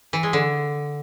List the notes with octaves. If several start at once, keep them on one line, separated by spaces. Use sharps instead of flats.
E3
G#3
D3